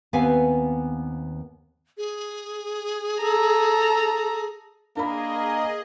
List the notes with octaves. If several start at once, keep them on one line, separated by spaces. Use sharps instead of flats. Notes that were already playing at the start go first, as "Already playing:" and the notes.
D#2 B3 C4 B4 F5 G#5
G#4
A4 A#5
A#3 D4 G#4 A#4 D#5 B5